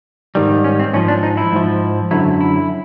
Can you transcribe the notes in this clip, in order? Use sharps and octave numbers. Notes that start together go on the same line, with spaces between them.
G#2 D#3 G3
C#4
C4
G#2 F3 C#4
D4
D#4
E4
G#2 F3
F#2 D3 F#3 E4
E4